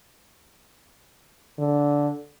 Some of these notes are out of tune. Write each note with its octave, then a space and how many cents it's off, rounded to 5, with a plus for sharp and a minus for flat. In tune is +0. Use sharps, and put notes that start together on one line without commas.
D3 -15